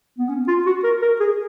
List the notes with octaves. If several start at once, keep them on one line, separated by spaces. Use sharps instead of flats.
B3
C#4
F4
F#4
A#4
A#4
G#4